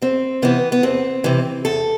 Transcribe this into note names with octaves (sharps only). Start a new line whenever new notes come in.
E2 C4
C3 E3 B3
B3
E2 C4
C3 E3
E2 A4